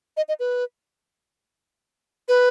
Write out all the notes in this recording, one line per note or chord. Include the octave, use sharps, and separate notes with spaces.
D#5
D#5
B4
B4